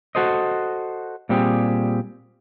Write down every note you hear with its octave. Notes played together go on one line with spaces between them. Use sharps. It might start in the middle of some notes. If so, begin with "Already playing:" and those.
F#4 A4 C5 D#5
A#2 G3 C4 G4 G#4